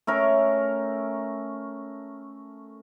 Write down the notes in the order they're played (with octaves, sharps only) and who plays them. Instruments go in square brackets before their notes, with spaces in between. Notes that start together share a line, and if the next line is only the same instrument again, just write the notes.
[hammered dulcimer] A3 C#4 A#4